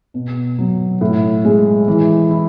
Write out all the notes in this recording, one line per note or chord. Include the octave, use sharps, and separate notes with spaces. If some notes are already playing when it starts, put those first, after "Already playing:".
B2
F#3
A2
G#3
E3
E4